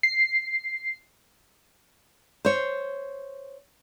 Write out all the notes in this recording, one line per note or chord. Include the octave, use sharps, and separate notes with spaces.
C7
C5 C#5